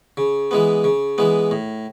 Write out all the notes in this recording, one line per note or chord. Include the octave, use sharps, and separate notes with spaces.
C#3
E3 G#3 B3
C#3
E3 G#3 B3
A2